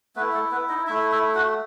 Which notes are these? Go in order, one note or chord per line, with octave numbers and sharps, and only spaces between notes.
A3 B3 E4 B4
A3 A4
B3 B4
D#4 D#5
A3 E4 E5
E4 E5
F#4 F#5